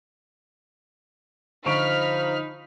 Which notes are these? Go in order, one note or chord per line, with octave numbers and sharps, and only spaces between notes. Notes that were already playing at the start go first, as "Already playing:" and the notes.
D3 F3 D#4 B5 C#6 F6 D7